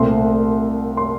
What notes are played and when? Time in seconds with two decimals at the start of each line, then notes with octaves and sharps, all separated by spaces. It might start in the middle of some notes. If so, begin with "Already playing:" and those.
Already playing: C2 A#2 A3 C4 C6
0.97 C6